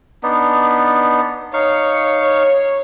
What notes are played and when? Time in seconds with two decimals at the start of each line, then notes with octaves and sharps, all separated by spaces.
0.23 B3 D4 D#4
1.54 D#4 C#5 F5 C#6
2.22 C#5